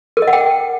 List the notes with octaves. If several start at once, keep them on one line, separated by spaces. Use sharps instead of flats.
A#4
D#5
F#5
G5